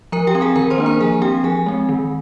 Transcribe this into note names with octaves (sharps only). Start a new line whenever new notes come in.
F3 A#4 A#5
G4 G5
C4
G#4 G#5
D#3 A#4 A#5
C5 C6
A#3 D4
A#4 A#5
F3 G#4 G#5
C4 G4 G5
F3 G#4 G#5
G#3 C4
D#3